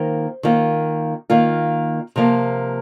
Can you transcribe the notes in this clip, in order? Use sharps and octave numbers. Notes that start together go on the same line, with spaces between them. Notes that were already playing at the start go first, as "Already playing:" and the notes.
Already playing: D#3 A#3 F4 C5
D#3 A#3 F4
D#3 A#3 F4
C3 F3 A#3